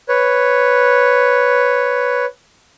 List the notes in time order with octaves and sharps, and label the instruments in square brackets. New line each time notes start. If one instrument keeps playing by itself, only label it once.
[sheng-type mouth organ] B4 C#5